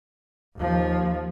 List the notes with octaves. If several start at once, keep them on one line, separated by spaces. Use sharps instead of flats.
D#2 F3